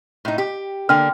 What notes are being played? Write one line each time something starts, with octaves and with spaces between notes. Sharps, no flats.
A2 D#4
G4
D3 A#3 G5 F6